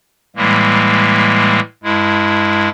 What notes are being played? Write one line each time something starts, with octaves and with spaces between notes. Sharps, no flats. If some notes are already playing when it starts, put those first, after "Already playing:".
A2 E3 G3 G#3 A#3
G2 G#3 E4